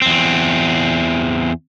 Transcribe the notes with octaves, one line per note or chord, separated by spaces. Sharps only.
E2 C4